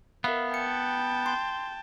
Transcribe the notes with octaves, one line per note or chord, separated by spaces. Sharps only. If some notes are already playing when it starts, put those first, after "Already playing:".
B3 A#4 E5 F5
G5 A5 C#7
C6